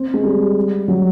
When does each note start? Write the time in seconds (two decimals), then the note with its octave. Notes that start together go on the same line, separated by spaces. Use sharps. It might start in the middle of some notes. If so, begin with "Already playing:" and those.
Already playing: C4
0.14 G#3
0.24 G3
0.88 F#3